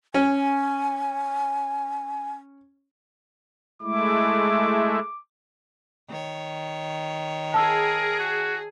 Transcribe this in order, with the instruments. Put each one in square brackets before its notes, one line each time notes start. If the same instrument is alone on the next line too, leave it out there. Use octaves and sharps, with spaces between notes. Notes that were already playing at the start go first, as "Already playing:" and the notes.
[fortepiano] C#4 [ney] G#5
[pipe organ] G#3 A3 E4 [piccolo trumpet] D6
[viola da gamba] D#3 C#5
[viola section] G#4 [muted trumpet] A#4 [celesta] A5 E6
[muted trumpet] F#4